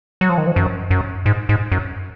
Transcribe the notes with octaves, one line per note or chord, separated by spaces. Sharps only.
F#3
F3
D#3
F3
F#2
F#2
G#2
G#2
F#2